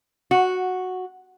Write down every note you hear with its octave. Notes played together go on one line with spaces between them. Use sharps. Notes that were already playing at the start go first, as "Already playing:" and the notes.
F#4